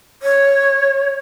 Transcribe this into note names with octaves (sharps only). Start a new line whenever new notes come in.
C#5